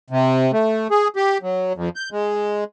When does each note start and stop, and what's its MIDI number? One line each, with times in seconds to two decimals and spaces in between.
0.10 0.51 48
0.52 0.88 57
0.91 1.08 68
1.16 1.38 67
1.42 1.73 54
1.75 1.89 41
1.96 2.09 91
2.12 2.64 56